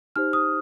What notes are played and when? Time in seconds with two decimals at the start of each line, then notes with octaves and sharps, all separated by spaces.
0.16 D#4 G4 C5 F6
0.33 D#6